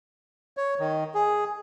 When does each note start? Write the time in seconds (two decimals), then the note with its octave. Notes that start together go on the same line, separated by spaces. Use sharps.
0.57 C#5
0.79 D#3
1.14 G#4